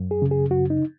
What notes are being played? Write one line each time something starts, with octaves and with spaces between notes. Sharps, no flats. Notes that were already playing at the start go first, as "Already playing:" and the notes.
Already playing: F#2
G#4
C#3
G#4
F#2 F#4
D#4